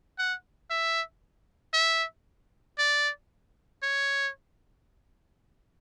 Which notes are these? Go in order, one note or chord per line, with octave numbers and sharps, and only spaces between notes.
F#5
E5
E5
D5
C#5